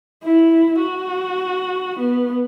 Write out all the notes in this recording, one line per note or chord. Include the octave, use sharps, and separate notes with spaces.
E4
F#4
B3